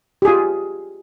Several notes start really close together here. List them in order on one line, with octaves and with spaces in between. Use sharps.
G4 G#4 F4